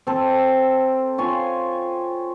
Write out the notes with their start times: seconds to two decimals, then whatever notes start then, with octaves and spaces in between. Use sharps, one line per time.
0.07 C4 A4
1.18 F4 C#5 G#5 C6